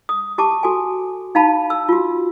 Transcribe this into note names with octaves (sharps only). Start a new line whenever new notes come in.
D#6
G4 A5 D6
F#4 A4 G#5
D#4 F5 A5 B5
E6
F4 F#4